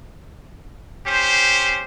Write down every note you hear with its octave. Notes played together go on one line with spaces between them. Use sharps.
C#4 G4 C5